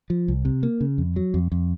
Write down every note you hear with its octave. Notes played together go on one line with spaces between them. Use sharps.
F3
C2
C3
A#3
C#3
F2
F#3
F2
F2